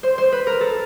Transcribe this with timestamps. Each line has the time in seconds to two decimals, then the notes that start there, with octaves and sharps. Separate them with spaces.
0.03 C5
0.18 C5
0.32 B4
0.47 A#4
0.61 A4